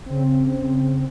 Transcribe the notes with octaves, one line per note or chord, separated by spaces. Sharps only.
C#3 C4